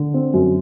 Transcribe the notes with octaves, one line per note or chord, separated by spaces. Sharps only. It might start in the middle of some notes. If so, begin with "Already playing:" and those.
Already playing: D3
C4
F#2